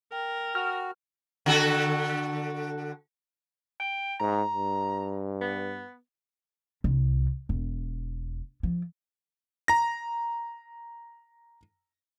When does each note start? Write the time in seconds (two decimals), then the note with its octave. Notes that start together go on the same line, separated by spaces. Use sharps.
0.12 A#4 G5
0.55 F#4 F6
1.46 D3 F#4 A4
3.80 G5
4.20 G#2 A#5
4.52 G2
5.41 B3
6.84 C2
7.49 E1
8.63 F3
9.68 A#5 A#6